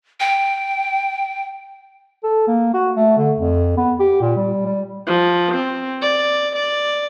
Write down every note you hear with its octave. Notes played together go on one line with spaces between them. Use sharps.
G5
A4
A#3
F#4
A3
D3
F2
B3
G4
A#2
G3
G3
F3
C4
D5
D5